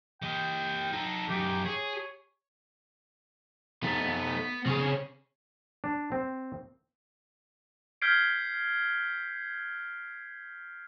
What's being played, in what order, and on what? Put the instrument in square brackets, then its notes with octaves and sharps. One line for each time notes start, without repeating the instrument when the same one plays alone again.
[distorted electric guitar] G4 D#5 [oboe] G5
[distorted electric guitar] D#4 A4
[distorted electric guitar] F#2 D#4 [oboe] G4
[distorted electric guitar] G#4 [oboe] C#5
[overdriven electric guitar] A3 D#4 [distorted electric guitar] B3
[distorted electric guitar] C#3 G#4 [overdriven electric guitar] C4 C#5
[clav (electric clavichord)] D4
C4
[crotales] F6 G6 G#6 B6 C7 D7